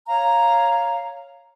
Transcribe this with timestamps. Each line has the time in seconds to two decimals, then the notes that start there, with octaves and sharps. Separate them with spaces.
0.08 C#5 F5 A#5